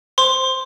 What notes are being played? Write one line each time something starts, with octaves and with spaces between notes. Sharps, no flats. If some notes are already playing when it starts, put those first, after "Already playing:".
C5 C6